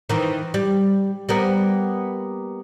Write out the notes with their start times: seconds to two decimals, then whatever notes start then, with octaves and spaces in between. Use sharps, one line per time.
0.09 D#3 E3
0.54 G3
1.29 G3 A#3 B3